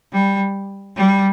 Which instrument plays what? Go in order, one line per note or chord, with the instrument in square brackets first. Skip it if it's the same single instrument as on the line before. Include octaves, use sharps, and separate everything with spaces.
[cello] G3
G3